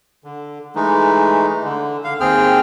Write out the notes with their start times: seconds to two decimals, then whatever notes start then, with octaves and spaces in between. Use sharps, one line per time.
0.24 D3
0.76 E3 G#3 A3 D#4
1.64 D3
2.04 D3 F5
2.20 D#2 C4 G#4 G5 F6